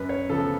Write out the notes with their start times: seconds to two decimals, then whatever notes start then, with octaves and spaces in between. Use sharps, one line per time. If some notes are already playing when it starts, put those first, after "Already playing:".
Already playing: F#2 B4
0.09 C#5
0.29 C#3 F3 B3 A4